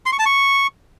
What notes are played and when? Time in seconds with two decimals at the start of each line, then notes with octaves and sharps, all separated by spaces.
0.06 C6
0.12 C#6
0.19 A5
0.26 C#6